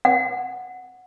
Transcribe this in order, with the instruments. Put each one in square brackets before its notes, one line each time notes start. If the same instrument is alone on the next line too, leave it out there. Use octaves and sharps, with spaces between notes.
[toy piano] F#5